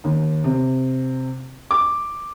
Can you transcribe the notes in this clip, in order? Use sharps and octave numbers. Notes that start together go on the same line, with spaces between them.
D#2
C3
D6